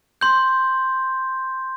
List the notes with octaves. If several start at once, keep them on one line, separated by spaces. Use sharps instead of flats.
C6 G6